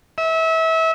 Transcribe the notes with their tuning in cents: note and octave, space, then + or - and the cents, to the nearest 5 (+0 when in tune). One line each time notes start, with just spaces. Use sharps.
E5 -30